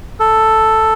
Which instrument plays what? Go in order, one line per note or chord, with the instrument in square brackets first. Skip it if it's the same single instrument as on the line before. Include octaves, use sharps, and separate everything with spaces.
[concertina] A4